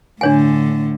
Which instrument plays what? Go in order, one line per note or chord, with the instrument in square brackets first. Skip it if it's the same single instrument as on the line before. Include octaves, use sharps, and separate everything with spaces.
[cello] A2 D3 [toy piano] D4 C#5 G#5